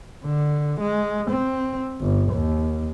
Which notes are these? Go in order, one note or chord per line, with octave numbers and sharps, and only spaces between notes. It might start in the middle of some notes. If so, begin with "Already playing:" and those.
D3
G#3
C4
G1
D#2